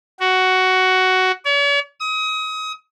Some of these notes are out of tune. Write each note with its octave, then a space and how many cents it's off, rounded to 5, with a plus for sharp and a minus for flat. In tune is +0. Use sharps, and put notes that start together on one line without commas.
F#4 +10
C#5 +45
D#6 +30